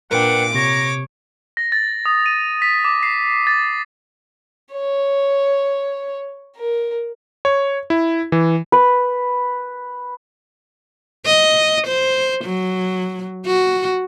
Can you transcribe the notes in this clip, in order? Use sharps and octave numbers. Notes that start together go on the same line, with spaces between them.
A#2 D4 A#4 B4 F#5 G5 D6
C3 C#5 A#5
A#6
A6
D#6
D#7
B6
D6
C7
A6
C#5
A#4
C#5
E4
E3
B4
D#5
C5
F#3
F#4